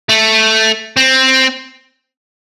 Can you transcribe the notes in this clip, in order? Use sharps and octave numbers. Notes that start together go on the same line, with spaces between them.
A3
C4